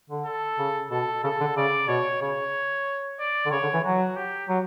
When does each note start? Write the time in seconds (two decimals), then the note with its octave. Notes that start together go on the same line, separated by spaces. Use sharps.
0.10 D3
0.26 A4
0.59 C#3
0.91 B2 A4
1.23 C#3 A4
1.41 D3
1.56 C#3 D5
1.89 B2 C#5
2.21 C#3 C#5
3.20 D5
3.46 D3
3.51 C#3 C#5
3.63 D3
3.74 E3
3.84 F#3 F#4
4.17 G4
4.49 F#3